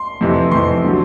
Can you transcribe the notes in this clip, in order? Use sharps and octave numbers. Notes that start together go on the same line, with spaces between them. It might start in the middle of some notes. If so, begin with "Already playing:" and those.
Already playing: C6
F2 C3 E3
F2 C3 E3 C6
D3 F#3